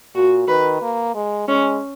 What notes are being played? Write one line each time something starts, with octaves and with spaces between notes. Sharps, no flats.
A#2 F#4
D#3 B4
A#3
G#3
G#3 C#4